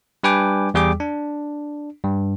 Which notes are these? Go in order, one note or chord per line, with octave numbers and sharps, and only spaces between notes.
G3 D4 B4 G5 G#5 D6
E2 G3 G#4 G5 D6
D4
G2